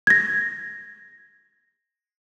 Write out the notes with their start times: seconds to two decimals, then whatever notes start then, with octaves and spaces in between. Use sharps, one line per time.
0.07 G#6 A#6